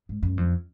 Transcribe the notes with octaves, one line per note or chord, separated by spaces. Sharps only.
G#2
F#2
F2